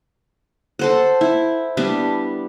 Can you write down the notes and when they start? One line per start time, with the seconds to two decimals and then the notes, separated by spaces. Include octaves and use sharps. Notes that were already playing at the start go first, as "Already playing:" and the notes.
0.79 A4 C5 F#5
1.21 E4
1.77 G3 B3 D4